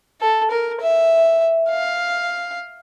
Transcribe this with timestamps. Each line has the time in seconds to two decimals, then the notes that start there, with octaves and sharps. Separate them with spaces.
0.21 A4
0.51 A#4
0.80 E5
1.70 F5